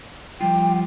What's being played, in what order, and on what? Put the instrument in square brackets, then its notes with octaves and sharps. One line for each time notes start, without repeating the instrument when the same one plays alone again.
[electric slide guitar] F3 G3 F4 [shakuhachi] G5